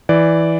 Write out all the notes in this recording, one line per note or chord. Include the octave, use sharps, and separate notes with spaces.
E3 D5